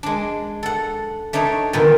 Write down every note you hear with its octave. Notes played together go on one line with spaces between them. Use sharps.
G#3 D4
A4 F#5
A3 D4 D#4 C#5
A#2 D3 D#3 B3